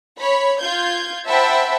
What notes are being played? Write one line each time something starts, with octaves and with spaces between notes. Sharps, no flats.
C#5 B5
F4 G6 G#6
C5 E5 F#5 G5 A5 B5